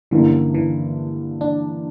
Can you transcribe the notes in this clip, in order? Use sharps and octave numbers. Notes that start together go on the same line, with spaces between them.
G2 D3 E3 A#3 C#4 E4
E3
D4